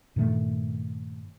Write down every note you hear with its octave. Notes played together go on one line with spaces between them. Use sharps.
G2 A#2 D#3 A3